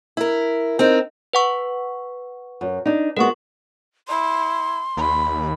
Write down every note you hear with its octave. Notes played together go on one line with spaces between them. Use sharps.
E4 A#4
C4 D#4 A#4
B4 F#5 C#6
F#2
D4 D#4
G#3 B3 F#4 A#4 C#6
E4 C6
D#2 B5